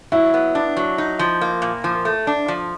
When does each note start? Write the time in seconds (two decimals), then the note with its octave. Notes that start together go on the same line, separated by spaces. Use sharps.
0.12 F#3 E4
0.34 B3
0.55 D4
0.77 F#3
0.98 D#4
1.19 F3
1.41 A#3
1.62 A#2
1.84 F3
2.05 A3
2.27 D4
2.48 F3